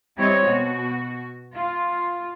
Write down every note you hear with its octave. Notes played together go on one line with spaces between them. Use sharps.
G3 C4 E4 C#5 D#5
B2 F#4
F4